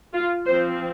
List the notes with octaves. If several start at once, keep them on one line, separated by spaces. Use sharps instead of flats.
F4
F3 C4 C5